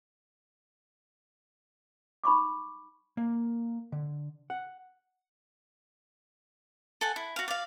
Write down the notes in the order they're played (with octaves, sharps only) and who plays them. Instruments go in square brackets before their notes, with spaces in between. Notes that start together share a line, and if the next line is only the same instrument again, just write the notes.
[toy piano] D#4 B5 C#6 D6
[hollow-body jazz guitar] A#3
D3
F#5
[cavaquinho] A4 F#5 G#5
E4
F#4 F5
D5 F5